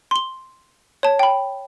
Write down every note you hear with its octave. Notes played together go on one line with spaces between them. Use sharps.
C6 G7
C#5 A5
G5 B5